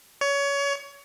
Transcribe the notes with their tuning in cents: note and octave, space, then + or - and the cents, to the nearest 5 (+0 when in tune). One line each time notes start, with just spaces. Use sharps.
C#5 +25